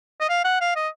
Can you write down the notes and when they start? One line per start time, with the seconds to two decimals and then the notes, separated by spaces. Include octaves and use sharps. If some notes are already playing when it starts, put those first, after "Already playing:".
0.20 D#5
0.30 F5
0.45 F#5
0.61 F5
0.76 D#5